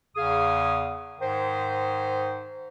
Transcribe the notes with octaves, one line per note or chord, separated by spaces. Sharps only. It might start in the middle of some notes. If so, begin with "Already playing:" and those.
E2 C#3 G#4 F5 D#6
G#2 D#3 C5